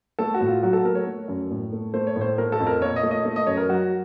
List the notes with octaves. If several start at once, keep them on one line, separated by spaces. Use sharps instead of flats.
A3 A4
F#4
A2
F4
F#3 F#4
A4
A3 A#4
C#5
A3
F#2
A2
A3
A3 C5
C#5
A2
C5
A3 A#4
A4
F2
A#4
A#2 C#5
D#5
A3
D#5
A3
D#5
F#2 C#5
A#4
F#3 F#4